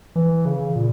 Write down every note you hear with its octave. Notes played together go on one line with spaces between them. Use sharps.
E3
C#3
A#2